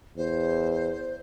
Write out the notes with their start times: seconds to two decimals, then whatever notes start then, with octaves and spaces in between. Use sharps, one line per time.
0.17 E2 C5